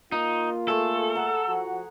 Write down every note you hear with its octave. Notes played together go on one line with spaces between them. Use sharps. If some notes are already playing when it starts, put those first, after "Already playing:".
A#3 D#4 F4
A3 G#4 A4
F#5 A#5
F3 F#4